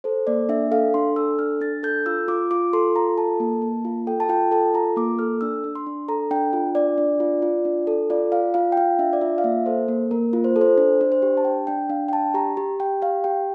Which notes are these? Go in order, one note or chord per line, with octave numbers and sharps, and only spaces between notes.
A4 C5
A#3 D5
D4 E5
A4 F5
D4 C6
A4 E6
D4 F6
D4 A6
A4 G6
F4 E6
F4 D6
F4 D6
A4 C6
F4 A#5
A4 A5
A#3
A#3
F4
A4 G5
A5
F4 G5
A4 A5
F4 A#5
A#3 D6
A4 F6
D4 E6
D4
C6
D4
A4 A#5
D4 G5
F4
D4 D5
D4
F4
F4
D4
A4
F4 D5
F4 F5
F4 F5
G5
F4 F5
D4 E5
D5
F4 E5
F5
A#3 E5
A4 C5
A#3
A#3 A#4
F4
C5
A4
C5
D4 C5
D4
C5
G4
A5
D4 G5
D4 G5
D4 F5
G5
D4 A5
G4 A#5
G4
G4 G5
G4 F5
G4 G5